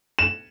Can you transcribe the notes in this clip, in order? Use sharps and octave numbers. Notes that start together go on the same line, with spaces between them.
E7